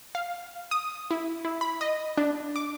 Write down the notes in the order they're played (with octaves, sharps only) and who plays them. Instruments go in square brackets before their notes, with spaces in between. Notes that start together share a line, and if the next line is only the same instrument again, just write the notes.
[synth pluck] F5
D#6
E4
E4
B5
D#5
D4
D6